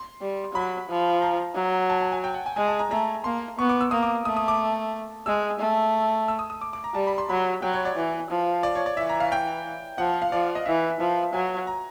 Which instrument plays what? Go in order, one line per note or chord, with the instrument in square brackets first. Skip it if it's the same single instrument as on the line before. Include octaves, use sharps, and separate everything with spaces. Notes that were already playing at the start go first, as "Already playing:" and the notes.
Already playing: [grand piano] C6
[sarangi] G3
[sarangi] F#3 [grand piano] B5
[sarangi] F3
[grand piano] A#5
[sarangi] F#3
[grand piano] A5
A5
G#5
G5
F#5
G#5
[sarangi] G#3 [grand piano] G#5
[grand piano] A5
A#5
[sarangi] A3 [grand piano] A#5
[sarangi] A#3 [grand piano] C6
[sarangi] B3 [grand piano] C#6
[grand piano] D6
E6
[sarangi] A#3 [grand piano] D#6
[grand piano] D6
[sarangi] A3 [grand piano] D#6
[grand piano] D#6
D6
[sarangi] G#3 [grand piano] E6
[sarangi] A3
[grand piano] E6
D#6
D#6
D6
D6
A#5
[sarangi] G3 [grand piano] A5
[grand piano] B5
C6
[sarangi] F#3 [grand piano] B5
[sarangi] F#3 [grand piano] G5
[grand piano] C#5
D5
[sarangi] E3
F3
[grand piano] D5
C#5
D5
[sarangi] E3 [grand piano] E5
[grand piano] A#5
F5
G5
[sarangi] F3 [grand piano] F#5
[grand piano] F5
[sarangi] F3 [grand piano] D5
[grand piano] D#5
[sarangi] E3 [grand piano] E5
[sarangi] F3 [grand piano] E5
[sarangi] F#3 [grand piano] G#5
[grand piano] A#5